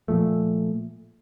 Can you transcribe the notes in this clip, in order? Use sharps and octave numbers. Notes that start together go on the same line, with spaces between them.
A#2 F3 A3